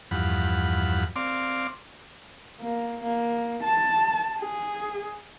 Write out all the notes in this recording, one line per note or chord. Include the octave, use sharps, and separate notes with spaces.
E2 G2 F3 F#5 B5
C4 D5 F5 C6 D6
A#3
A#3
A5
G#4